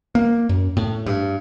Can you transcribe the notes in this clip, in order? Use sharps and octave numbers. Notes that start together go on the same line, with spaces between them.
A#3
F#2
A2
G2